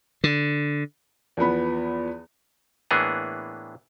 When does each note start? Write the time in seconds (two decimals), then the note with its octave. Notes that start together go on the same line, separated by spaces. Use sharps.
0.24 D3
1.37 E2 F3 B3 B5
2.91 A2 E3 A#3 B3 D4 G#4